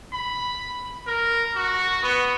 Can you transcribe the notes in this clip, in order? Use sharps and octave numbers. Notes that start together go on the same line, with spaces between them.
B5
A#4
F#4
B3